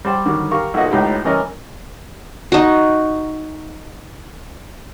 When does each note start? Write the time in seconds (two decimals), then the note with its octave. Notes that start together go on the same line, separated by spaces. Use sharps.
0.05 G3 C5 G5
0.25 D3 D#3 F#3 G3
0.51 G4 A#4 F5 C#6
0.74 B1 A#2 A#3 F#4 D#5
0.91 C#2 A2 D#4 G4
1.25 E3 G3 C#4 A#4 D#5
2.52 D#4 F#4